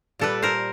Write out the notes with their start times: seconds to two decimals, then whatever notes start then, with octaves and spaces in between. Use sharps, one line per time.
0.19 A#2 G3 A4 B4
0.42 A#4 C5